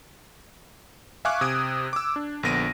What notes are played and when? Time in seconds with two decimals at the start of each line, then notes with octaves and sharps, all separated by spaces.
1.25 E5 F5 G#5 C#6 D6 F#6
1.41 C3 D#6 G#6 D7
1.93 D6 E6
2.16 D4
2.43 A#1 D3 B3 A#6 D7 D#7